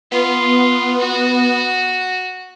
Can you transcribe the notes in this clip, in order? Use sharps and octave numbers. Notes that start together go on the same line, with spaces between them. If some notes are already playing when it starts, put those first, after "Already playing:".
B3 F4
F#4